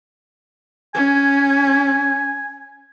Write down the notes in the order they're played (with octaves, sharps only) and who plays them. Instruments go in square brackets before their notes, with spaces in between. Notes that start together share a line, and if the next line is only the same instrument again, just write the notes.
[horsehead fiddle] C#4 [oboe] G#5